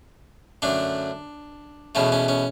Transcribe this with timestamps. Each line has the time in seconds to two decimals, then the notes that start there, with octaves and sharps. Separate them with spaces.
0.62 F#2 D3 A3 D4
1.95 E2 B2 A3 C#4
2.12 C#4
2.28 C#4